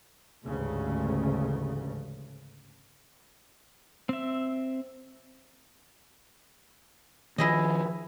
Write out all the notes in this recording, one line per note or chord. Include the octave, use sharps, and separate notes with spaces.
A1 D2 G#2 C#3
C4 E5
D#3 F3 E4 G#4 D#5